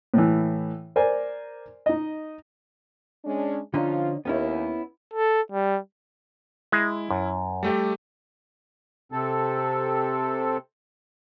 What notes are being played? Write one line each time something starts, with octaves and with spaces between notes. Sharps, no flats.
A2 E3
A#4 C5 D5 G#5
D#4 D#5
G#3 C#4 D4
D3 F3 C#4 D#4 F4
D#2 B3 C#4 E4
A4
G3
G#3 E4
F#2
G3 A3 G4
C3 C4 A4